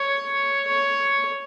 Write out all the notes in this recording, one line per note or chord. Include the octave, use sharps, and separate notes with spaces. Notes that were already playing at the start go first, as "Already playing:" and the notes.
Already playing: C#5
C#5